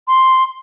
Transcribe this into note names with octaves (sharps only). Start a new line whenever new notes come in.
C6